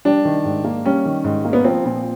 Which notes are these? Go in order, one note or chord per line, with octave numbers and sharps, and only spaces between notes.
G3 D4
D#3
G#2
A#3
G3 C#4
D#3
G#2
A#3
B3
F3 C4
A#2